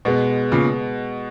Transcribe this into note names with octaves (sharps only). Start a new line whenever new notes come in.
B2 G#3 B3
A#2 C#3